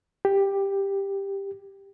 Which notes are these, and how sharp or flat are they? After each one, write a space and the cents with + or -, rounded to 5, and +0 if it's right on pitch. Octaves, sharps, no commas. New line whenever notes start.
G4 +10